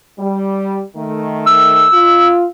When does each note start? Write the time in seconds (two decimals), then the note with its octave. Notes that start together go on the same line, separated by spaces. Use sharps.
0.19 G3
0.97 D#3 A3
1.46 E6
1.93 F4